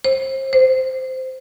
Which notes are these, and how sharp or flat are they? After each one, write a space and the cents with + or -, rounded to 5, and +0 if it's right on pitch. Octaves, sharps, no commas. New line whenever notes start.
C5 +30
C5 -10